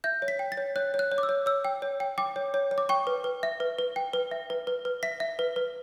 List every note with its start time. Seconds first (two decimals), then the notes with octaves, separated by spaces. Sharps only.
0.04 E5 G6
0.22 C#5
0.28 B6
0.39 G5
0.52 A6
0.57 C#5
0.76 C#5 F#6
0.94 C#5
0.99 F#6
1.11 C#5
1.18 D6
1.23 E6
1.29 C#5
1.46 C#5 E6
1.65 G5
1.82 C#5
2.00 G5
2.18 G5 D6
2.36 C#5
2.54 C#5
2.71 C#5
2.78 D6
2.89 G5 C#6
3.07 B4
3.24 B4
3.43 E5
3.60 B4
3.79 B4
3.96 G5
4.13 B4
4.31 E5
4.50 B4
4.67 B4
4.85 B4
5.03 E5 B6
5.20 E5
5.39 B4
5.56 B4